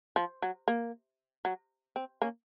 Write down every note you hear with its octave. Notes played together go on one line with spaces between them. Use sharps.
F3
F#3
A#3
F#3
C4
A#3 C#4